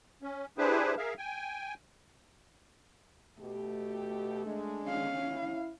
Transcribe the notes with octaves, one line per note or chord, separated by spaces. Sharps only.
C#4
D4 E4 G4 G#4 B4 C5
G#4 A#4 E5 F5
G5 G#5
B2 A3 G4
G#3 D4
C#4 F5
E4